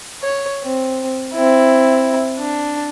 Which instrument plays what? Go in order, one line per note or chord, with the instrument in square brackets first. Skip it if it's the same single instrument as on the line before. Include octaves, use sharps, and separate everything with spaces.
[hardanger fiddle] C#5
C4
C4 E4
D4